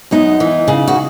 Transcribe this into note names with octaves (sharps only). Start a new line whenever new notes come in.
F#2 B3 D#4
E3
C#3
F#4